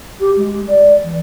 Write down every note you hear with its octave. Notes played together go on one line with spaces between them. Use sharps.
G4
G#3
D5
E3